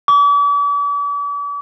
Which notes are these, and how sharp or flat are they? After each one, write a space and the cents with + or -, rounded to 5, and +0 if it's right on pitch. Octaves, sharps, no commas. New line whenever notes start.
D6 -45